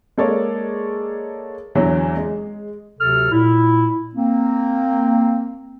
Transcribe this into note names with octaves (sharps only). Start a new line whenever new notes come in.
G#3 A#3 A4 C#5 D5
E2 D3 E3 F#3
G#3
D2 C3 F#3 A4 F6
A#2 E4
A#3 C4